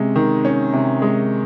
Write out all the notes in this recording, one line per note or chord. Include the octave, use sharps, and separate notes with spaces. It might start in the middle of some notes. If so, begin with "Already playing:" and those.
Already playing: C3 G#3 C#4
D#3
C#4
C3
G#3